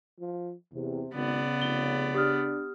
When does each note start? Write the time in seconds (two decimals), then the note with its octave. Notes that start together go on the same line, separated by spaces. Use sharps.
0.20 F3
0.74 E2 C3
1.14 G#1 C#3 B3 D5
1.61 F1 G7
2.14 D4 G4 D#6 F6